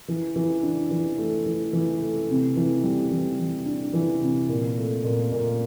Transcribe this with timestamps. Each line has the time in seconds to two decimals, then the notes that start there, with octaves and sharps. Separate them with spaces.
0.08 E3
0.36 E3
0.63 D4
0.91 E3
1.18 A3
1.46 E3
1.73 E3
2.01 A3
2.29 C3
2.56 E3
2.83 G3
3.11 E3
3.39 E3
3.66 D4
3.94 E3
4.22 C3
4.49 A#2
4.77 A3
5.04 A#2
5.32 A#2